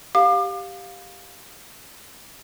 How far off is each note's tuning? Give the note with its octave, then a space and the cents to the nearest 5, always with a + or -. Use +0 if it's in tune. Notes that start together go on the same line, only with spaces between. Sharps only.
G4 +0 F5 +15 D6 +35